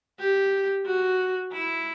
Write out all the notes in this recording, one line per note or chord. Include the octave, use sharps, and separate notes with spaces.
G4
F#4
E4